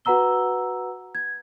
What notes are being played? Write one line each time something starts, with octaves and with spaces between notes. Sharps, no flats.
F#4 B4 F#5 A#5 E6 G7
G#6